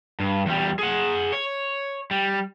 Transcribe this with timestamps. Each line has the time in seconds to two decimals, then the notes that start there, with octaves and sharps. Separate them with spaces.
0.20 G2
0.46 E2 G3
0.79 G#4 F#5
1.32 C#5
2.11 G3